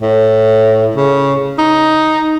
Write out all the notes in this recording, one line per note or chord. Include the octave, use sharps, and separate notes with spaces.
A2
C#3
D#4